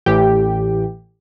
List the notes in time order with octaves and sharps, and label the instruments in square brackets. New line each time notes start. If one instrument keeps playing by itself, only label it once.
[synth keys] A1 A2 E3 G4 G5